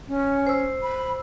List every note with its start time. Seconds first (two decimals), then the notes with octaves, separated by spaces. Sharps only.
0.08 C#4
0.47 C5 E6
0.83 B5